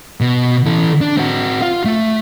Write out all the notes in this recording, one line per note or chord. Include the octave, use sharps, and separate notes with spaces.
B2
E3 A4
D4
C4 F#4
F4 F5
A3